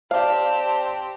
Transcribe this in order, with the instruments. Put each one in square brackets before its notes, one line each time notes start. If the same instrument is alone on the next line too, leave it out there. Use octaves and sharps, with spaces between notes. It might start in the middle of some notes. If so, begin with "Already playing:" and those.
[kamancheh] C4 G4 [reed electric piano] C5 D5 [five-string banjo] F5 [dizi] A5